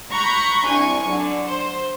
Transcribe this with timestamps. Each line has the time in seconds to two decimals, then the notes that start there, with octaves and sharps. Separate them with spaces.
0.13 A#5 B5 C#6 F#6 G6
0.67 C2 D4 G#5 C#6
1.08 D3 F#3
1.48 C5